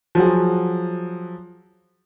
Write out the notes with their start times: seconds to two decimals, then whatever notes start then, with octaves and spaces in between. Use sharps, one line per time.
0.15 F3 F#3 F#4 G#4